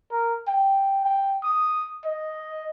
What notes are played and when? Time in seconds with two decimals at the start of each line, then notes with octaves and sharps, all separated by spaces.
0.12 A#4
0.48 G5
1.05 G5
1.44 D#6
2.05 D#5